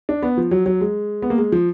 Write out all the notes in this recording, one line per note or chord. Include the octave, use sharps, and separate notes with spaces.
D4
B3
F3
F#3
F#3
G#3
B3
A#3
G#3
F3